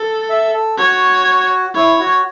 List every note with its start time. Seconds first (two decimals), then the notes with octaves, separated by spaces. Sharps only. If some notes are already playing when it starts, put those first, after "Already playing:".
Already playing: A4
0.29 E5
0.53 A4
0.78 F#4 C#5
1.75 E4 C#5
2.00 F#4